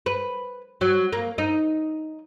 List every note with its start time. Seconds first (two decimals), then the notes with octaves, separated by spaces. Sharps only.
0.06 B4
0.81 F#3
1.13 A#3
1.38 D#4